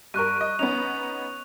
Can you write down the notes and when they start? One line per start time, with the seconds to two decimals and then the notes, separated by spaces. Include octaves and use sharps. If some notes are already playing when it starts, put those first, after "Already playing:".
0.14 G2 A#4 C#6 F#6 D#7
0.41 D#5
0.59 B3 C#4 D#4 F7